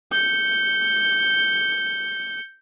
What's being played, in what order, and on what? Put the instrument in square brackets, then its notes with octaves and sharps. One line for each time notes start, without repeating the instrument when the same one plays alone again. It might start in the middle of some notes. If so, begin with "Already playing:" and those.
[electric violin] G6 C#7